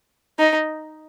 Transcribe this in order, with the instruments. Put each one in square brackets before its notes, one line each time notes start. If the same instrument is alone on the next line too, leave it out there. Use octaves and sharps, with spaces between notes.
[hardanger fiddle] D#4